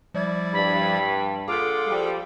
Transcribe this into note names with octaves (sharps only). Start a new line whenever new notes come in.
F3 G3 E4 D5 G#6
G2 B5
A#2 D3 F4 G#4 A4 D6
F3 G3